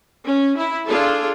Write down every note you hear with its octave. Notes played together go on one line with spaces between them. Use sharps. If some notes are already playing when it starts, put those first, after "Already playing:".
C#4
E4
D4 F4 G#4 A4